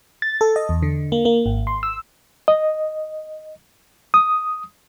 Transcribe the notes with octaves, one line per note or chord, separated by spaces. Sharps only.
A6
A4
D#5
E2
D3
A#3
A#3
G#1
C6
E6
D#5
D#6